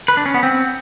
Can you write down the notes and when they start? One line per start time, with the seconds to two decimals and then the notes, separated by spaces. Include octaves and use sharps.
0.08 B4
0.17 D4
0.26 C#4
0.34 B3
0.43 C4